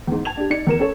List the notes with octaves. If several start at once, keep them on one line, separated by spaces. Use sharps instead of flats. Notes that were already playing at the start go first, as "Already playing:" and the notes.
E2 G#2
A5 G#6 F7
D4 G4
D#4 D5 C#7
E2 A#4 E7
C#4 A4 C#5